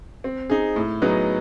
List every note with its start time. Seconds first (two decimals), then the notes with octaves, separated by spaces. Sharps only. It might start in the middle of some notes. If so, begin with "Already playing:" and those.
0.24 C4
0.50 D#4 G#4
0.76 A2
1.02 F#3 B3 D#4 G#4